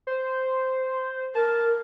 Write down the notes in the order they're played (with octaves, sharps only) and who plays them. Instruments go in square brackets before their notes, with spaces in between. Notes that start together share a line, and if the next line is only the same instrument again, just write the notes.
[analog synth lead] C5
[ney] A#4 [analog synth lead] A5